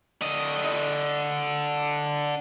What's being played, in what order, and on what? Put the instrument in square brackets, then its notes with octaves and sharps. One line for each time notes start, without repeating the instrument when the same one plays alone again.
[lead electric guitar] D3 D#5